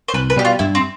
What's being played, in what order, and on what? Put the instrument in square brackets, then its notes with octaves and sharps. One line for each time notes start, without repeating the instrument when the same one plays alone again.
[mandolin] C5
[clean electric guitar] C2 [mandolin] B4
[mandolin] B4
[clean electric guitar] B2 G3 [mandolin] G4
[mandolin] F4
[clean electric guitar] G2 [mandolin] E4
[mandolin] C4